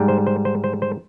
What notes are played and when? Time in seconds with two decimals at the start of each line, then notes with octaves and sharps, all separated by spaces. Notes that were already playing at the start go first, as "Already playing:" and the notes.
Already playing: G#2 G3
0.08 C5
0.27 C5
0.45 C5
0.64 C5
0.82 C5